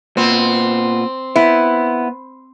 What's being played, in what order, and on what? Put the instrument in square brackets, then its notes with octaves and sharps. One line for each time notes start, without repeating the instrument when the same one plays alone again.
[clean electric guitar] A#2 B3 [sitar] C4
[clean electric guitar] B3 [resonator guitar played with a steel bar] E4